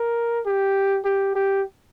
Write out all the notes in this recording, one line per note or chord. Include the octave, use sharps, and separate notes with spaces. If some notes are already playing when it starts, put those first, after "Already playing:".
Already playing: A#4
G4
G4
G4